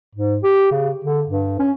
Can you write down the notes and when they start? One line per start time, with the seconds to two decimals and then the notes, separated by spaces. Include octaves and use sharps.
0.15 G#2
0.43 G4
0.72 C#3
1.05 D3
1.27 G2
1.59 C#4